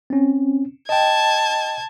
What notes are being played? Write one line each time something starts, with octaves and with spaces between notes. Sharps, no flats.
C4 C#4
D#5 G5 A5 G#6